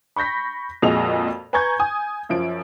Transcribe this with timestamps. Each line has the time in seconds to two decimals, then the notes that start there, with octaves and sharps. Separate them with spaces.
0.16 B5 C#6 G6 A#6 B6
0.82 F2 A#2 G#3 F#4 D#5 F7
1.53 B4 G#5 A#5 C#6 G6 G#6
1.80 G#5 D#6
2.29 F#2 F3 D7